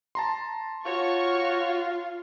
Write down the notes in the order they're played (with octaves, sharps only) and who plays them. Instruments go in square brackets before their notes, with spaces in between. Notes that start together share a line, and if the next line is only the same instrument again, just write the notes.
[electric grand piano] A5 A#5 C6
[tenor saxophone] F4 [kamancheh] F#4 C#5 [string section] C#6